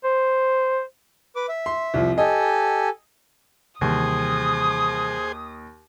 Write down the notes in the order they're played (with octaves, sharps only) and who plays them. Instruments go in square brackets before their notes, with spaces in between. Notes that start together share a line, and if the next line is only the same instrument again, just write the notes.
[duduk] C5
[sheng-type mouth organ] B4 D6
E5
[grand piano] C6
C2 F3
[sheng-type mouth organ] G4 A4 G#5 [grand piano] D#5
[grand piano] D#2 [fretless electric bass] C3 E3 G3 [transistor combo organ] G#4 C5 [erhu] D#6